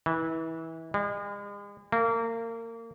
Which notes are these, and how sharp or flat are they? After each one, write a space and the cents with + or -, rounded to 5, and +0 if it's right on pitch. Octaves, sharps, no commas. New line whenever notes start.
E3 -25
G#3 -40
A#3 -30